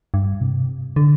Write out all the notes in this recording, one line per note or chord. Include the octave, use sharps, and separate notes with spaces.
G2
C3
D3